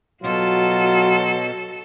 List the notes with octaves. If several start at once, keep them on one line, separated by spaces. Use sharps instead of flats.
B2 F#3 F4 F#4 A4